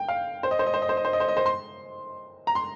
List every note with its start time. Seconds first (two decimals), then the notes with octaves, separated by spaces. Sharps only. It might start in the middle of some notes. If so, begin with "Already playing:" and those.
Already playing: G5
0.08 F5
0.43 C5
0.51 D#5
0.59 C5
0.67 D#5
0.74 C5
0.82 D#5
0.89 C5
0.97 D#5
1.05 C5
1.13 D#5
1.20 C5
1.28 D#5
1.37 C5
1.46 C6
2.47 A#5
2.55 C6